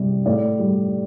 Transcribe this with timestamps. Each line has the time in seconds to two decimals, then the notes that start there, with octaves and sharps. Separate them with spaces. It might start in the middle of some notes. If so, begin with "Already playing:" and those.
Already playing: C3 G3
0.26 A2 D5
0.59 G3